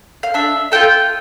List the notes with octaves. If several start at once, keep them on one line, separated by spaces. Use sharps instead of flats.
F5
D4 E5
F4 A4 G5